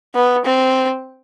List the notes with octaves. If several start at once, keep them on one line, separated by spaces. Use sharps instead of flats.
B3
C4